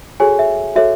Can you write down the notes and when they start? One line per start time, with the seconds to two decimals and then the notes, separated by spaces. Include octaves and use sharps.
0.20 F#4 G#4 A4 C#5 G#5
0.39 E5
0.76 F#4 A4 C#5 E5